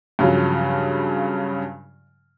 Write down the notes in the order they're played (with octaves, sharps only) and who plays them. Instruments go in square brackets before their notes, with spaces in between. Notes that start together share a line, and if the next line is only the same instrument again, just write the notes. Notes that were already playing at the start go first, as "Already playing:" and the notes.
[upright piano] G2 C#3 F3 F#3